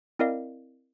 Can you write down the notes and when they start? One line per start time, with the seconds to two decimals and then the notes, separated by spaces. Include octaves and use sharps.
0.19 C4 E4 A#4 D5 D#5 F5